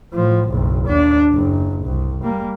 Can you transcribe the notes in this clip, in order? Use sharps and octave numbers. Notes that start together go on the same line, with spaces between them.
A2 F3
F#1 B1
D#2 D4
F#1 F#2
C2
G3 A#3